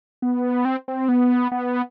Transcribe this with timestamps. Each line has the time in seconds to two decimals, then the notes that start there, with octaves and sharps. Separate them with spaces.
0.22 B3
0.65 C4
0.88 C4
1.09 B3
1.52 B3